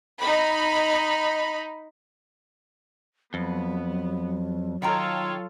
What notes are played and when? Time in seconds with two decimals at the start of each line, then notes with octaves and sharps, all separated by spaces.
0.20 D#4 B5
3.34 F2 F#3 B3
4.82 D#3 F4 A4 C#5 G5 A#5